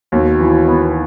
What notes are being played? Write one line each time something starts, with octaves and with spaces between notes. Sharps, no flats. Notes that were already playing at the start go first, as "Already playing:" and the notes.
D#2 B2
E3
B3